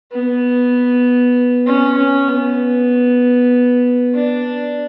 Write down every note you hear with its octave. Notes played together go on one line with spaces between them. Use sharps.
B3
C#4
C#4
B3
D4